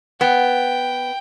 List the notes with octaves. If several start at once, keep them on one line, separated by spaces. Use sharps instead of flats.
B3 G5